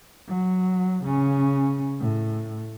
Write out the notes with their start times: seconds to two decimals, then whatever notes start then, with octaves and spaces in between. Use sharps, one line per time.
0.29 F#3
1.05 C#3 C#4
2.00 A2